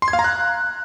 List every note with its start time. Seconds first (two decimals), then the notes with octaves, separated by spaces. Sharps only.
0.02 C6
0.08 G#6
0.13 F5
0.19 A#5
0.24 F#6